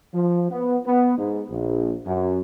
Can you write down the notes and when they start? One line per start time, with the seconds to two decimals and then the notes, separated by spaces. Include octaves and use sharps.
0.13 F3
0.51 B3
0.86 B3
1.18 G#2
1.50 A#1
2.06 F#2